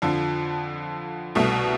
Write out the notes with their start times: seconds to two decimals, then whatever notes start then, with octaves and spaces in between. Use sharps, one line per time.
0.02 F2 D3 F3
1.35 C2 B2 A3